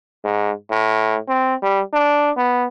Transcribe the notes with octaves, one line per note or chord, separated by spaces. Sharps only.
G#2
A2
C4
G3
D4
B3